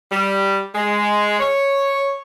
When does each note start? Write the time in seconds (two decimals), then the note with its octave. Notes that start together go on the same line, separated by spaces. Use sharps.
0.10 G3
0.75 G#3
1.40 C#5